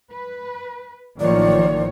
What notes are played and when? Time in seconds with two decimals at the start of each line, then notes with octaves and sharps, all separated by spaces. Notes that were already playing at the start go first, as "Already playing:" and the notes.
0.11 B4
1.20 A1 D#3 F3 F#3 A#3 C#5 D5